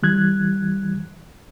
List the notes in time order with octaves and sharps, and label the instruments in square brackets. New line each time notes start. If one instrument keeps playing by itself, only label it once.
[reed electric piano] E3 G3 F#6 G#6